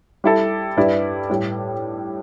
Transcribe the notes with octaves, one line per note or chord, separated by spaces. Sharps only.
G3 E4 A4
G2 G3 E4 B4 D5
A2 G3